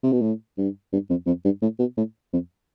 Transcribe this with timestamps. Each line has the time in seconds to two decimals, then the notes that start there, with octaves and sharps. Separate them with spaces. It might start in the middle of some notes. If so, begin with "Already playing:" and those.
0.03 C3
0.12 B2
0.22 A2
0.57 G2
0.92 G2
1.10 F2
1.26 F2
1.45 G2
1.62 A2
1.79 B2
1.97 A2
2.33 F2